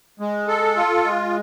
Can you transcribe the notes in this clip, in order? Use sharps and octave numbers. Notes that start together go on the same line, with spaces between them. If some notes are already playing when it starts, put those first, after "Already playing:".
G#3
A4
F4
G#3